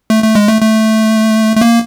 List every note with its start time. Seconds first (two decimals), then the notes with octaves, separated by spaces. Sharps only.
0.10 A3
0.24 A3
0.35 G#3
0.48 A3
0.61 A3
1.56 A3
1.61 A#3